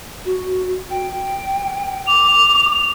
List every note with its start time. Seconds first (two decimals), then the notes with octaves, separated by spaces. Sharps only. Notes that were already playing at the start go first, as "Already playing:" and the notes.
0.25 F#4
0.90 G5
2.07 D6 F7